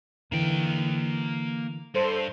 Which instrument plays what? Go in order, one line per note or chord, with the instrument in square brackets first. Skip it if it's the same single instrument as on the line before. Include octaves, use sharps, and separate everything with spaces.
[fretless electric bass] D3 E3 [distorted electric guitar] A#3 G5
[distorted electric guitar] G2 [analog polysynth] A4 C5 C6